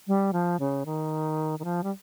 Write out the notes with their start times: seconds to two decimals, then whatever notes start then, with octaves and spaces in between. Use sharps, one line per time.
0.07 G3
0.33 F3
0.60 C#3
0.86 D#3
1.59 D#3
1.64 F3
1.83 G3